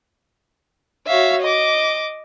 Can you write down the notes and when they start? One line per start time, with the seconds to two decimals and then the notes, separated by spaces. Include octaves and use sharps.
1.08 F#4 C#5 E5 F5
1.42 D#5 D6